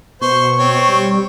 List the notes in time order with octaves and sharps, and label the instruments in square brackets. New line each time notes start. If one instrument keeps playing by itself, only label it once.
[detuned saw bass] B2 [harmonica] C5 [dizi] C#6
[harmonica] C4 C#5
[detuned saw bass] G3